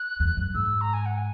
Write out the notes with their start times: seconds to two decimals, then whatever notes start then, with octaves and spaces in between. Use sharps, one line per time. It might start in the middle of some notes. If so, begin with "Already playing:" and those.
Already playing: F#6
0.20 E2
0.37 F#2
0.54 G#2 E6
0.81 A#5
0.93 G#5
1.06 F#5
1.18 G#5